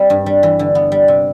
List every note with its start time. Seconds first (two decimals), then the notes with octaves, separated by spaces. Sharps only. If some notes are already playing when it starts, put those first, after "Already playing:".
Already playing: G3 C4
0.10 G2
0.26 G3
0.43 E3
0.59 D3
0.75 B3
0.92 G3
1.08 C3